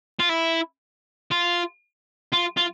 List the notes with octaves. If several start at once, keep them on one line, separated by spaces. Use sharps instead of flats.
F4
E4
F4
F4
F4